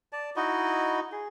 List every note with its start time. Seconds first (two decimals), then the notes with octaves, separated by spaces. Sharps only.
0.13 D5 A5
0.36 D#4 E4 F#4 D#5
1.12 G#4